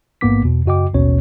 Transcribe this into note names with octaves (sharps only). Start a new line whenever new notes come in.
A1 G#2 A#3 B3 D6 B6
E2 B2
F#2 C#3 F#4 D#5 G5 D6
A1 D#2 B2 C#4 C#5